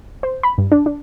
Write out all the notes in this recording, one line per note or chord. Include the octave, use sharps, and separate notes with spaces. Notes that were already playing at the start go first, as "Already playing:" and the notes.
C5
B5
G2
D4
D4